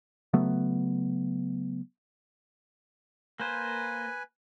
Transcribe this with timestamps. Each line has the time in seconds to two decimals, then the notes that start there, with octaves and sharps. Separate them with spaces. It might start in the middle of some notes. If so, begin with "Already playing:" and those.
0.33 C#3 F#3 A3 B3
3.40 A#3 B4 C5 G#5